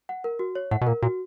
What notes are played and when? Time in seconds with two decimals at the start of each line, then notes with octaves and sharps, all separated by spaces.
0.09 F#5
0.24 A#4
0.39 F#4
0.55 C#5
0.71 A2 F#5
0.81 B2
0.87 A#2 A#4
1.02 A#2 F#4